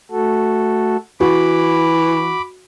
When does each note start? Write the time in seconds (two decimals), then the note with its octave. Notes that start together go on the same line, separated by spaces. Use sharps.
0.11 A3 F#4 A4
1.21 E3 F#4 B5 D6